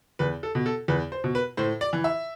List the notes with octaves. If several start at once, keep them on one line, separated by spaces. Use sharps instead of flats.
E2 B4
A4
B2
A4
E2 B4
C5
B2
B4
A2 C5
D5
E3
E5